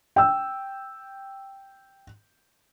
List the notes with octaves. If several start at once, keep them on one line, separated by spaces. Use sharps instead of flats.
G5 E6